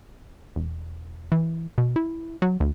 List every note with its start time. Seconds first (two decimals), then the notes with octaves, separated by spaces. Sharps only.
0.56 E1
1.32 E3
1.78 B2
1.96 E4
2.42 F#3
2.60 D2